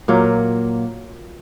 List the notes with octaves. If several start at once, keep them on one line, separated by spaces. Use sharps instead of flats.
A#2 F#3 A#3